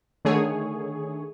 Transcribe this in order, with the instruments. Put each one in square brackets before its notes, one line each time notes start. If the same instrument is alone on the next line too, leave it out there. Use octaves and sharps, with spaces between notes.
[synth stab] D3 D#3 A3 G#4 C#5